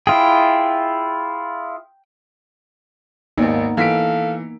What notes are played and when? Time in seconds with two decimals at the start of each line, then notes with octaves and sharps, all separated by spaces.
0.07 E4 F4 G#4 G5
3.38 G#1 D#2 A#3 B3 D#4
3.77 E3 A4 F5 B6 D7